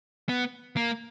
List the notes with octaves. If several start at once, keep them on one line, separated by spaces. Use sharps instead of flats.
B3
A#3